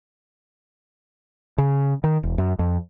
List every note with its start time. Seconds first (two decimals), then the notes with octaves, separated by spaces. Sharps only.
1.58 C#3
2.04 D#3
2.23 E1
2.38 F#2
2.59 F2